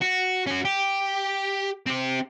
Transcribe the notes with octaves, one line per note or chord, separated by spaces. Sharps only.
F#4
C#4 F#4
G4
C4 G4